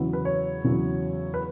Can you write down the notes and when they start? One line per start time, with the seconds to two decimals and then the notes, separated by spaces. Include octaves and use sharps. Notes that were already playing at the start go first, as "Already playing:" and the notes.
Already playing: E2 C#3 F#3 B3 E4
0.13 B4
0.25 C#5
0.64 E2 C#3 F#3 B3 E4
1.34 B4